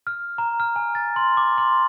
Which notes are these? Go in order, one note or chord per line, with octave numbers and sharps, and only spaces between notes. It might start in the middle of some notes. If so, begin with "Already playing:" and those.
F6
A#5
F6
G#5
A6
C6
D6
C6